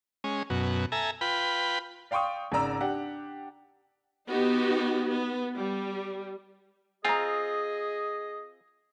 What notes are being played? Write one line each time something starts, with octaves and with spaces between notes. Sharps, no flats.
G#3 C#4
F#2 B2
A4 E5 G#5 A#5
F4 B4 G5 B5
D5 F5 G5 C6 C#6 D#6
G#1 C#3 D5 A#5 E6
D4 G4 F#5
B3 D#4 F#4 G4
B3
G3
C4 F4 G#4 D#5 G#5 A#5